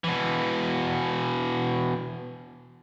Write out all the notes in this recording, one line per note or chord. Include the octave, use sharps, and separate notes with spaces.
B2 E3